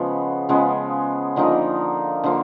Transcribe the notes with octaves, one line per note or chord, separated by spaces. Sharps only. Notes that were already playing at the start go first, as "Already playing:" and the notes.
Already playing: C#3 F3 G#3 B3
C#3 F3 G#3 B3
D3 F3 A#3 D#4
D3 F3 A#3